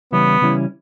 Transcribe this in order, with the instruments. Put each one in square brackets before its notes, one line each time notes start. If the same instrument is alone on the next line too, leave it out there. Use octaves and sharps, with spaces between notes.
[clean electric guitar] C#3 E3 G3 C#4 E4 [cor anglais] B3
[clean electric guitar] C#3 E3 G3 C#4 E4